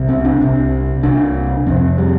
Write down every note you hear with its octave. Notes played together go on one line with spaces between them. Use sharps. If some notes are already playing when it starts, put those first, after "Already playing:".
Already playing: C2 C3
C4
D4
C2 C3
C2 C3 D4
F2 C3 C4
G3